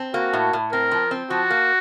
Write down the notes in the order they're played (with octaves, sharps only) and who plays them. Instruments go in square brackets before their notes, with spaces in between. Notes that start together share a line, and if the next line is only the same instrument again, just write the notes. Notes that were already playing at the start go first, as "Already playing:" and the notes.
Already playing: [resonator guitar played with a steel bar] C4
[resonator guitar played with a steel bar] A#3 [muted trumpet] F#4
[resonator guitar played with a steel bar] A2
A2
[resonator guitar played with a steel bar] C4 [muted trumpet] A#4
[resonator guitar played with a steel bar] F3
C4
[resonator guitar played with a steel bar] F3 [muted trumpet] F#4
[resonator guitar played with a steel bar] A#3